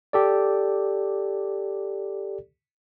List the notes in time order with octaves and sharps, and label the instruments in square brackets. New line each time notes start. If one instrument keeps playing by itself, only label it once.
[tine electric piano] G4 A4 D5